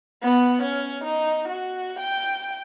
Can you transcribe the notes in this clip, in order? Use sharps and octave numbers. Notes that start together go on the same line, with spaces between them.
B3
C#4
D#4
F#4
G5